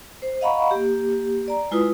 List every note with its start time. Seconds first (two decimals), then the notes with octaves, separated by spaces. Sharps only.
0.22 C5
0.41 D#5 F5 F#5 A#5 B5 C#6
0.71 A#3 G4
1.48 D5 A#5
1.71 G#3 E4 F4 B4 D#6